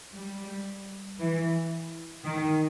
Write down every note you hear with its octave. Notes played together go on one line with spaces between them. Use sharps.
G3
E3
D#3